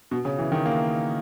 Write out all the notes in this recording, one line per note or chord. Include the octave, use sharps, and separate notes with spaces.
B2
C#3
E3
D#3
A#3